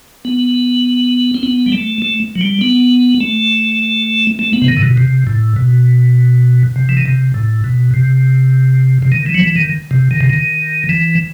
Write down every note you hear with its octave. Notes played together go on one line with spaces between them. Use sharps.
B3
C4
B3
G3
A3
A3
F#3
G3
B3
A3
A3
B3
C3
D#3
A2
B2
C3
A2
B2
C3
E3
D#3
C3
A2
B2
C3
C3
D#3
E3
F#3
E3
D#3
C3
D#3
C3
D#3
E3